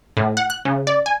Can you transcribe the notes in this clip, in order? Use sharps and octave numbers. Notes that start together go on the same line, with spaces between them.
A2
F#5
F#6
C#3
D5
G#5